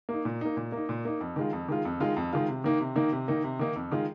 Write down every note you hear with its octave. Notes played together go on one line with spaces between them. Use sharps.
A#3
D#4
A#2
A#3 D#4
A#2
A#3
D#4
A#2
A#3 D#4
F2
D#3 G#3 F4
F2
D#3 G#3 F4
F2
D#3 G#3 F4
F2
D#3 G#3 F4
C3
D#3 A#3 D#4
C3
D#3 A#3 D#4
C3
D#3 A#3 D#4
C3
D#3 A#3 D#4
F2
D#3 G#3 F4